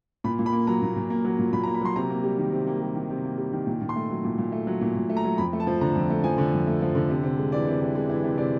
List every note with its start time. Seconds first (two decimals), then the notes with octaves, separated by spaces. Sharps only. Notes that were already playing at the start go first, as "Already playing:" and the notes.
0.24 A#2 B5
0.39 A#2
0.46 B5
0.53 A#3
0.67 F#3 A#5
0.82 A#2
0.96 A#2
1.10 A#3
1.25 F#3
1.39 A#2
1.53 A#2 B5
1.63 A#5
1.68 A#3
1.74 B5
1.81 F#3 C6
1.96 C3 A#5
2.10 A#3
2.24 G3
2.39 D#3
2.52 C3
2.67 A#3
2.81 G3
2.96 D#3
3.10 C3
3.25 A#3
3.38 G3
3.53 D#3
3.67 A#2
3.81 A#2
3.89 C6
3.96 A3
4.10 F#3
4.24 A#2
4.38 A#2
4.52 A3
4.67 F#3
4.81 A#2
4.95 A#2
5.10 A3
5.17 A#5
5.24 F#3
5.38 F2 B5
5.53 A3
5.60 A5
5.67 F3
5.81 D3 A#5
5.96 F2
6.10 A3
6.24 F3 G#5
6.38 D3
6.53 F2
6.67 A3
6.81 F3
6.95 D3
7.10 C3
7.23 C3
7.38 G#3
7.52 E3 D5
7.67 C3
7.81 C3
7.95 G#3
8.09 E3
8.24 C3
8.38 C3 D5